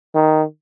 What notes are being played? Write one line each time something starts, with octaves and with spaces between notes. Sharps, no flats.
D#3